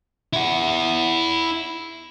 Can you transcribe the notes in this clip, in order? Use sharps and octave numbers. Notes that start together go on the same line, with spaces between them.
E4 F#5